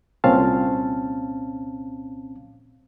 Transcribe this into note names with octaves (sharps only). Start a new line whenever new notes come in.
C2 A#2 C4 C#4 F5 A5